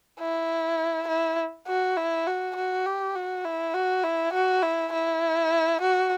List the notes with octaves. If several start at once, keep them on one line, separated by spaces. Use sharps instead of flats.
E4
E4
F#4
E4
F#4
F#4
G4
F#4
E4
F#4
E4
F#4
E4
E4
F#4